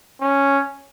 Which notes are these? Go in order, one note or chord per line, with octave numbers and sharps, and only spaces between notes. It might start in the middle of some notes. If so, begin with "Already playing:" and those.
C#4